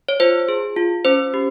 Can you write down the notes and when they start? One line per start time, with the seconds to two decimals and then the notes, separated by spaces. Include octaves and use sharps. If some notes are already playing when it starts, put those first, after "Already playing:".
0.09 C#5
0.20 F4 C5
0.48 G#4
0.76 F4
1.05 C#4 C5
1.34 G4